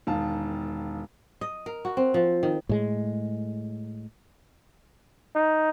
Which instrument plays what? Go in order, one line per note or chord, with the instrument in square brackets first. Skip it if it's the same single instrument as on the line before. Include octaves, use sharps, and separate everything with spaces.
[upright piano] E1 D#3 F5 A5
[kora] D#5
A#4
F#4
C4
F3
D#3
[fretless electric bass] A2 G#3
[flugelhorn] D#4